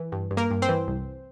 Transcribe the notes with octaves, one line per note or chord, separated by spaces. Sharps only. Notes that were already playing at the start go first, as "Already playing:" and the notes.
Already playing: E3
G2
G2
A#3 A#4
G2
C4 C5
E3
C2